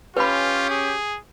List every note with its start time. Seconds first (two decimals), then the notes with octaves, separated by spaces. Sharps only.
0.17 C#4 F4 G4 B4 B5
0.69 G#4